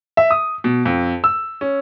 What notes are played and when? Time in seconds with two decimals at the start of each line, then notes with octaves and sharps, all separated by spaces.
0.17 E5
0.31 D#6
0.64 B2
0.85 F2
1.24 E6
1.61 C#4